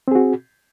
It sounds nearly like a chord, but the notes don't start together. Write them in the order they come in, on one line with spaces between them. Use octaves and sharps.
C4 G#4 F#4